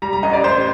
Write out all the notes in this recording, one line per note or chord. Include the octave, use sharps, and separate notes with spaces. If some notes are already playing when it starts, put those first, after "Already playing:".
G3 A#5
A#5
A1 D#5
D5
A1 C5